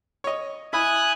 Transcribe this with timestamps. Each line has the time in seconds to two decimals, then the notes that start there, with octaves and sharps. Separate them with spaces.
0.24 C#5 D#5
0.73 E4 G#5 B5 D#6 F#6